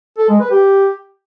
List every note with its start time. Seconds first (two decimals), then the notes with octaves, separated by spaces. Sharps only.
0.18 A4
0.29 G#3
0.40 B4
0.51 G4